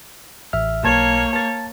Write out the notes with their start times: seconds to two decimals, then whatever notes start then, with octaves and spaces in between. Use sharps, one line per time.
0.53 A1 E5 F6
0.84 B1 A#3 C#5 A5 G#6
1.33 A5 A6